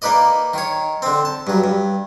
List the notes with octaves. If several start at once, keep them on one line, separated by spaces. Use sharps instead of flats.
A#3 D#4 B4 D5 D#5
D#3 C#5
D3 C4
A5
G2 F#3
G2